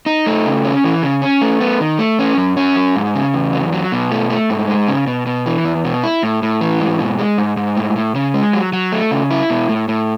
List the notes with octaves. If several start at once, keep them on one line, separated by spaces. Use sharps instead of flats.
D#4
A3
C#3
C#4
E3
C#3
C#4
A3
B3
D#3
A3
C#4
F#2
C#4
F#3
G#2
C#3
E2
F#3
F#3
B2
A3
A3
G#2
G#3
C#3
B2
B2
E3
E2
B2
E4
A2
A2
E3
G#2
B2
G#3
G#2
G#2
A2
A2
C#3
G#3
F#3
F#3
A3
C#3
E4
B2
A2
A2